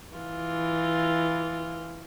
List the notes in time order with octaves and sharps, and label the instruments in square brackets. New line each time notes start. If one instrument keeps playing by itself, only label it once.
[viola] E3 F4